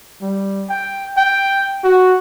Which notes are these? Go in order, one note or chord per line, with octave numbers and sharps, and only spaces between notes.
G3
G5
G5
F#4